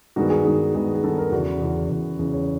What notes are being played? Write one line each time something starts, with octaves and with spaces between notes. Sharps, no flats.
G2 D#3 G#3 B3 F#4
G#4
G2 D#3 G#3 B3
G2 D#3 G#3 B3
G#4
G2 D#3 G#3 B3 A4
A#4
E2 C#3 E3 F#4
E2 C#3 E3
E2 C#3 E3
E2 C#3 E3
C#5